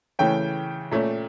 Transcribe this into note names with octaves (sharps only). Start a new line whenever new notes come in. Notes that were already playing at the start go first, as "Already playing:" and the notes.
C#3 E3 A3 C#4 G5
A#2 A3 C#4